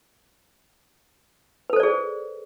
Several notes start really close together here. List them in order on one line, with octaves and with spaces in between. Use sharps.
B4 A4 C5 D5 G#4